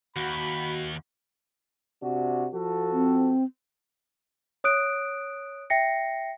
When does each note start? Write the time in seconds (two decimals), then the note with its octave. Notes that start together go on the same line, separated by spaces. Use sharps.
0.16 D#2 F#4 B5
2.03 C3 D4 F#4
2.55 F3 F#4 A4
2.92 C4
4.64 C#5 D#6 F#6 D7
5.70 E5 G5 A#6 C7 C#7